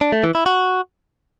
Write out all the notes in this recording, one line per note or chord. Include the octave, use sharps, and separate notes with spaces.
D4
A3
E3
E4
F#4